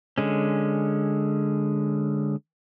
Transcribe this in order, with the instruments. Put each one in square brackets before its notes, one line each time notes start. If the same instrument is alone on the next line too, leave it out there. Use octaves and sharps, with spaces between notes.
[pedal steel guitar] D3 G#3 C#4